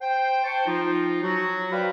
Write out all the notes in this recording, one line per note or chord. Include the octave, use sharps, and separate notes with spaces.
C5 G5
C5 G5 A5 C#6
F3 D#4 F4
F#3 F#4
B4 C5 D5 F5 G5 B5